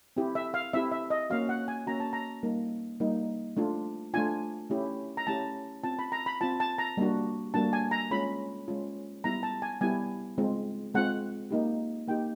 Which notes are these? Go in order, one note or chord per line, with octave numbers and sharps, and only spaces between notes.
C4 E4 G4
E5
F5
C4 E4 G4 E5
E5
D#5
A#3 C#4 F#4 F5
F#5
G#5
A#3 C#4 F#4 A#5
A5
A#5
G3 A#3 D#4
G3 A#3 D#4
A3 D4 F4
A3 D4 F4 G#5
A3 C#4 E4 G4
A#5
A3 C#4 E4 G4 A5
C4 F4 A5
B5
A#5
B5
C4 F4 A5
A5
A#5
G3 A#3 D4 F#4
G3 A#3 D4 F#4 A5
G#5
A#5
G#3 C#4 F4 B5
G#3 C#4 F4
G3 B3 E4 G4 A#5
A5
G#5
G3 B3 E4 G4 G#5
G#3 C4 F4
G#3 C4 F4 F#5
A#3 D#4 G4
A#3 D#4 G4 G5